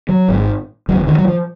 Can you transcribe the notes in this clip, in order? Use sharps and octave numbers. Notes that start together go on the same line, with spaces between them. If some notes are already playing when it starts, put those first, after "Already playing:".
F#3
G#1 G#2
F1 D#2 C#3 F#3
D#3
F#3
F3